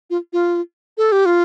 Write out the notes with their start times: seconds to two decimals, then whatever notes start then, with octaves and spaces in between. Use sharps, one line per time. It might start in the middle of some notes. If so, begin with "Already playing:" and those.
0.10 F4
0.33 F4
0.98 A4
1.12 G4
1.26 F4